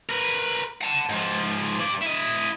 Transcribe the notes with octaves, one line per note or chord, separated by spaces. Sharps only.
A#4 B4
F#5 A5
G#2 F3
G2 D5
E4 D#5